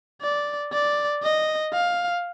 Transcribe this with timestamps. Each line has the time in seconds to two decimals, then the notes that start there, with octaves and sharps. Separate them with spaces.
0.21 D5
0.72 D5
1.23 D#5
1.73 F5